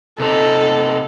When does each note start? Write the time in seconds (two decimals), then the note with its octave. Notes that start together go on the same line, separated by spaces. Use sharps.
0.20 C3 D#4 A4